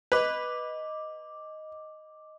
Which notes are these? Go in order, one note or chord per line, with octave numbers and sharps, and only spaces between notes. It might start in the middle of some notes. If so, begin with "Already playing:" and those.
B4 D#5 D6